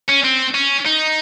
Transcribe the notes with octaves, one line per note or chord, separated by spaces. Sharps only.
C#4
C4
C#4
D#4